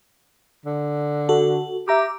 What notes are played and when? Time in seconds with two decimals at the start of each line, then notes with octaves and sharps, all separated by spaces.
0.66 D3
1.29 F#4 A4
1.88 G4 E5 A#5 D6